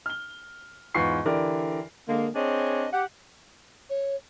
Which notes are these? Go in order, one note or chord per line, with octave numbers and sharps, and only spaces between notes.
F6 G7
E2 G#2 F4 B4 C#6 C7
D3 E3 G4 A#4 D5
D3 G#3 A#3
C4 D4 G#4 C#5 D#5
G4 F#5
C#5